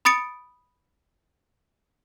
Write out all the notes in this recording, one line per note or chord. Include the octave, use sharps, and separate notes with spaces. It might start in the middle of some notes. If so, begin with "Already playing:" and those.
B5 D#6 A6 C#7 D7